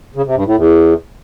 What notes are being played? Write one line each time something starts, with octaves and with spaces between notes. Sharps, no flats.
C#3
C3
G2
A2
E2